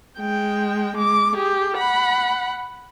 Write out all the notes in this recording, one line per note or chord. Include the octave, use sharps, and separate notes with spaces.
G#3 G5
G#3 D6
G4 G#4
F#5 B5